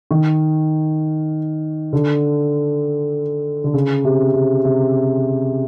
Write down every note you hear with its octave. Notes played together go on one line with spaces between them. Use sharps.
D#3
D3
D3
C#3
C3
C3
C3